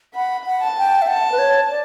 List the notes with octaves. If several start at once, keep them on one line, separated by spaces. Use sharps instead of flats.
F#5 B5
F#5
A5
G5
E5
F#5 A5
B4
C#5
D5